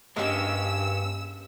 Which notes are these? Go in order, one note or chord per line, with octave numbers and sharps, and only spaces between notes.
G2 G#3 A#3 C#4 G4 E6